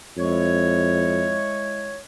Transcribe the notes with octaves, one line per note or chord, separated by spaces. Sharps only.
F2 G#3 E4 C#5